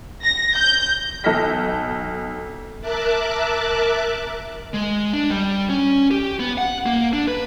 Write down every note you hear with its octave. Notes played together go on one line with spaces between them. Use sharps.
A#6
G6
B1 A4 D#5 F6 A#6 B6
A#4 E5 A5 D6 F#6
G#3
D4
G3
C#4
G4
B3
F#5
A#3
D4
B4